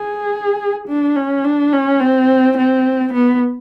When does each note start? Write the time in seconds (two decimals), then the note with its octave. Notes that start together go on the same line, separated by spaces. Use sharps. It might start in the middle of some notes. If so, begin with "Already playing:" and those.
Already playing: G#4
0.88 D4
1.16 C#4
1.44 D4
1.72 C#4
2.00 C4
2.58 C4
3.13 B3